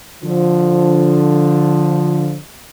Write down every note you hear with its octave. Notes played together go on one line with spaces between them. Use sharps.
D3 F3